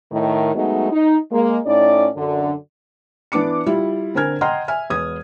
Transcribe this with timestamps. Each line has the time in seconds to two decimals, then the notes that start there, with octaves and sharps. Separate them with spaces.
0.12 A2 D#3
0.55 F#3 G#3 A3 B3 D#4
0.92 D#4
1.32 G#3 A#3
1.66 A2 C#4 D#4 D5
2.16 F#2 D3
3.32 E3 B3 D4 D6 C#7
3.66 G3 E4 F4
4.15 D3 C4 A#4 G#5 F6 G#6
4.41 D#5 F#5 G5 A#5 C6 F6
4.68 E5 G#5 F6
4.90 E1 B3 D#6 G#6